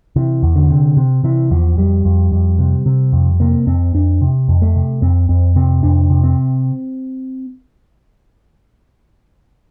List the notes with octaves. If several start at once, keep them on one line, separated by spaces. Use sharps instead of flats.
C3 E3
E2
D3
C3
C3
C3 E3
E2 F3
F2 G3
F2
F2
C3
C3
F2
C3 A#3
F2 C4
F2 D4
C3
F2
A3
C3
F2 C4
F2 C4
C3 C4
F2 D4
C3
C4